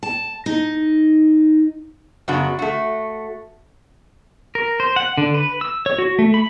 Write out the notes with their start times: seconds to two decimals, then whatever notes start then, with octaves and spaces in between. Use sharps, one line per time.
0.03 A5
0.46 D#4
2.28 F#2 C#3 B3 D4 F#4
2.59 A3 F#4
4.55 A#4
4.80 C5
4.96 F#5
5.17 D3
5.34 B4
5.61 E6
5.86 C#5
5.99 F#4
6.19 A3
6.34 B5